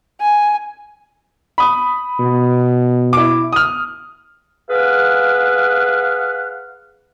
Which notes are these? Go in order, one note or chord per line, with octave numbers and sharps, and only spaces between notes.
G#5
B5 D#6
B2
E4 D6
D#6 F6
G#4 B4 F5 F#5